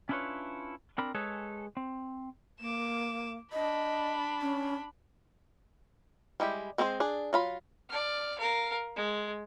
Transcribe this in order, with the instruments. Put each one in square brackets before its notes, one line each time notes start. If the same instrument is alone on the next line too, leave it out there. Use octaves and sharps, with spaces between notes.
[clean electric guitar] C#4 D4 E4 F4 B4 C#5
C4 D4 A#4 B5
G#3 G#4 A4 B4 C#5
C4
[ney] A#3 [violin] D6 E7
[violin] D4 B5 [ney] D#5
[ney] C#4
[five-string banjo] G3 G#3 E4 G4
G#3 C4 G#4 A4 C5
D4 G#4
F#3 F4 B5
[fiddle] D5 F6
A#4 F5
G#3